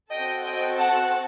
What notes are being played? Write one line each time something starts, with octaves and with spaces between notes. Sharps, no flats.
C4 F#4 A4 D#5 G5
D#5 G5
F#5 A5